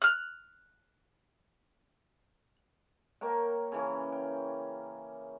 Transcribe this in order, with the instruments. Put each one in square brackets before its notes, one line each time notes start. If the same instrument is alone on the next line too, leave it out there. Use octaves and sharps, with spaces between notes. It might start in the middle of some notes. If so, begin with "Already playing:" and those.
[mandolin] F6 F#6
[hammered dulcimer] A#3 A#4 C#5 G5
C#3 E3 C#4
G5